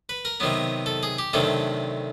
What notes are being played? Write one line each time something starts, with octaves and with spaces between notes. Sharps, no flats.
B4
A#4
C3 D#3 F#3 B3
A4
G#4
G4
D2 C3 D#3 F#3 A4